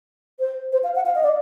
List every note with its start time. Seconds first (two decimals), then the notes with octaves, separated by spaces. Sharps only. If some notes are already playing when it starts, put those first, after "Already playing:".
0.39 C5
0.72 C5
0.84 F5
0.95 F#5
1.06 F5
1.15 D#5
1.23 D5